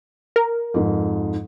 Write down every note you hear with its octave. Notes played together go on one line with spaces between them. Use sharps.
A#4
F2 G#2